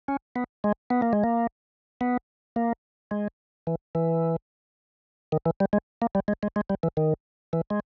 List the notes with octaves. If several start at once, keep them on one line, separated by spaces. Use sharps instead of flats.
C#4
B3
G#3
B3
A#3
G#3
A#3
B3
A#3
G#3
E3
E3
D#3
E3
G3
G#3
A#3
G3
G#3
G#3
G#3
G3
E3
D#3
E3
G#3